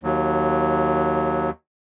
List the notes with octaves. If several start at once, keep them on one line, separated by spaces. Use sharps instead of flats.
D#2 F#3